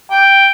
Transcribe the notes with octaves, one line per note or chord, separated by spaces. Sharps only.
G5